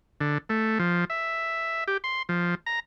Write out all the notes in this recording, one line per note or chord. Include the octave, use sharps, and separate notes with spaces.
D3
A3
F3
E5
G4
C6
F3
A#5